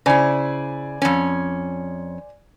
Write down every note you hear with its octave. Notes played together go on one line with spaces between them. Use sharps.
C#3 E4 C5 D5 G#5
F2 C#4